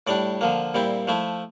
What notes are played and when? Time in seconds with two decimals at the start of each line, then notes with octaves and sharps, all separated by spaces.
0.07 A2 G3 D4 D5
0.41 D3 F3 A#3
0.74 A#2 G3 C4 E4
1.08 F3 A3 E4